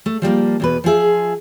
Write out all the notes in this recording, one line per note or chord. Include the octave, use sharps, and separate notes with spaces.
A3
F3 G3 G#3 A#3
E2 B2 B4
F3 F4 G#4 E5